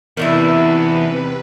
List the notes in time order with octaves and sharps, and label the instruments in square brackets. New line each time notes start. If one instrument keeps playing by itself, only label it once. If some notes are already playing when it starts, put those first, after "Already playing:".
[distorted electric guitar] E2 [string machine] C3 B4 [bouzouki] D#3 D4 E4